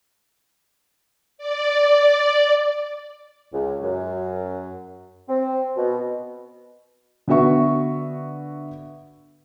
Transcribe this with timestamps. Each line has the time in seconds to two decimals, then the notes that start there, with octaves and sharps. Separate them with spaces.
1.38 D5
3.53 C#2
3.82 F#2
5.29 C4
5.77 B2
7.28 D3 B3 F#4 E5 C#6